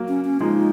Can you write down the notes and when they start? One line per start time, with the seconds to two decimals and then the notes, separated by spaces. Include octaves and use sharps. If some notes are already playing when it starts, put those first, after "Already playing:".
Already playing: F#3 A#3
0.08 C#4
0.25 C#4
0.40 F3 G#3 D#4